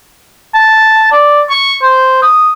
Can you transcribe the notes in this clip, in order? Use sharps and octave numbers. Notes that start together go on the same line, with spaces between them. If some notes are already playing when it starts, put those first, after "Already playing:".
A5
D5
C#6
C5
D#6